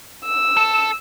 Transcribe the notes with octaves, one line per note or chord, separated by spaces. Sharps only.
E6
A4